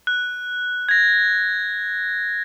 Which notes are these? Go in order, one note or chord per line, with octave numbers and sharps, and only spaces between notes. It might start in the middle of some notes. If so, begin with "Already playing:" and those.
F#6
G#6 A#6